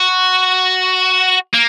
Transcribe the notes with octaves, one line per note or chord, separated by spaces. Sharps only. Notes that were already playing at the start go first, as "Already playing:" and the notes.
Already playing: F#4
A#3